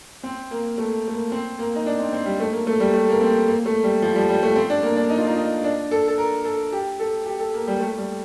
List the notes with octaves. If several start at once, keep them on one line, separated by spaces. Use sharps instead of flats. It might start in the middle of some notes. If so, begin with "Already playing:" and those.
C4
A#3
A3
A3
A#3
C4
A#3
D#4
D4
C4
C4
G3
A3
A#3
A3
G3
A3
A#3
C4
A#3
A3
G3
F3
G3
G3
A3
C4
D4
A#3
D4
D#4
F4
D#4
D#4
D4
A4
A4
A#4
A4
G4
A4
G4
A4
A#3
G3
A3
G3